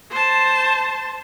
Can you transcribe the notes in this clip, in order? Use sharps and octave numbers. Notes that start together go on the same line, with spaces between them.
C5 A5